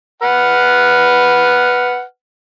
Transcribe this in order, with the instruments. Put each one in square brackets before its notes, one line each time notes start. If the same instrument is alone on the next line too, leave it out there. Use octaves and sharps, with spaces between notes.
[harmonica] B4 F#5 F6